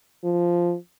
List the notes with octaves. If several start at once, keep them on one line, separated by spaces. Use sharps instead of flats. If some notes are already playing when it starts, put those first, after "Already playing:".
F3